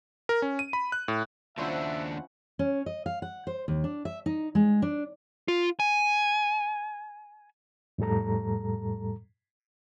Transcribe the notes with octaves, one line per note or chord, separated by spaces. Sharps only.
A#4
C#4
D#7
B5
F#6
A2
D#2 F3 C#4 D4 E4 C5 E5 F#5
C#4
D#5
F5
F#5
C5
D#2
D4
E5
D#4
G#3
D4
F4
G#5
F2 A2 G3 A4 A#5